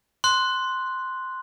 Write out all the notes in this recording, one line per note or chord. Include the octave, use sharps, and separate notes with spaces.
C6 F#6